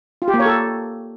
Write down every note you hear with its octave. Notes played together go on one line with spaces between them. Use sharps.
F4
G4
A#3
C#5
A4